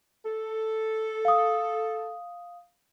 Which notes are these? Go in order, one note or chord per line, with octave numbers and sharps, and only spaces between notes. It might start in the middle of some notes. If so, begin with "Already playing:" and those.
A4
F5 D#6